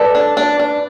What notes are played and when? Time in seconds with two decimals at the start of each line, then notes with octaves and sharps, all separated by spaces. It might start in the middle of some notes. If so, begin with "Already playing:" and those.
Already playing: A4 B4 D5
0.15 D4
0.37 D4
0.59 D4